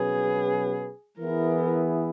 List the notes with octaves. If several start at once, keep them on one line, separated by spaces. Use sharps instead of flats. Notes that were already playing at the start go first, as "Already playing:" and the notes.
Already playing: B2 F#3 C#4 F#4 G#4 B4
E3 B3 E4 G#4 A#4